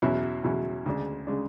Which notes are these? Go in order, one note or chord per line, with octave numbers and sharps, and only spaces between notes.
E2 B2 F#3 C#4 E4
E2 B2 F#3 C#4 E4
D2 C#3 G#3 D4
C#3 G#3 D4